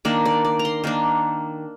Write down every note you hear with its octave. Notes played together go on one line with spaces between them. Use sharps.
D#3 A#3 D4 D5
D5
D5
A#5
C6
D#3 A#3 D4